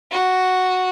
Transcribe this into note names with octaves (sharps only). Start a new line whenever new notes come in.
F#4